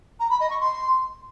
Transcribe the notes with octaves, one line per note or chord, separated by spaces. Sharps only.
A#5
B5
D#5
C#6
C6